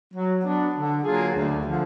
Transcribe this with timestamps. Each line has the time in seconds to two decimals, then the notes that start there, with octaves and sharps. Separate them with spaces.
0.14 F#3
0.44 B3 D4
0.74 D3
1.04 F#3 A#3 F4 G#4
1.34 D2
1.65 D3 F3